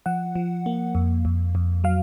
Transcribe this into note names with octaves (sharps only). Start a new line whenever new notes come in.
F3 F#5
F3
A#3
F2
F2
F2
F#3 F5